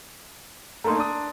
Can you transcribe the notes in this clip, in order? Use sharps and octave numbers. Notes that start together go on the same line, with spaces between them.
A3 A#3 D#4 A#5 C6
D4 D#6